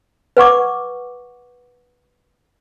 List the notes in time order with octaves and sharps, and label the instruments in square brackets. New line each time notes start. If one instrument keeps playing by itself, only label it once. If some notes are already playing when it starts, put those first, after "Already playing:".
[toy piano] B4 F#5 C#6 D6